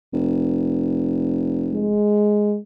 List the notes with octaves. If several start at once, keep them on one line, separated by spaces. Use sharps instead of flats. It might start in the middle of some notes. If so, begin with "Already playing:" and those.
F1
G#3